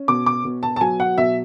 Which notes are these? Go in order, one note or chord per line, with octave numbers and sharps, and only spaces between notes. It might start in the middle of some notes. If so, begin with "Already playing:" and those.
Already playing: C#4
B2 D6
D6
B2
A5
A5
F#3 G#5
F#5
B2 E5